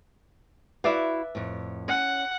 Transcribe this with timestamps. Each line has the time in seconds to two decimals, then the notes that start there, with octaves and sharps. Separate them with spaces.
0.84 E4 F#4 B4 D5 E5 F5
1.35 F2 A2
1.88 C#4 F#5